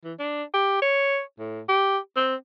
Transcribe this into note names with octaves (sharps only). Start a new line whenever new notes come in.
E3
D4
G4
C#5
A2
G4
C4